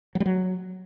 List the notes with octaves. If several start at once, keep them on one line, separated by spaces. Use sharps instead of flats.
F#3
G3
F#3